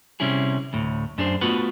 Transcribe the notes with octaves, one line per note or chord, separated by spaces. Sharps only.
C3 G3 C#4 E4 G#4
D2 A2
F#2 D4 G#4 C5
A3 B3 F4 F#4 B4